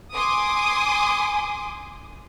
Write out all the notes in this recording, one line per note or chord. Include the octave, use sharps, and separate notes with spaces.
G#5 C6 D6 D#6